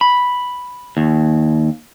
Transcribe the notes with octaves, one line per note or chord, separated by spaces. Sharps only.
B5
D#2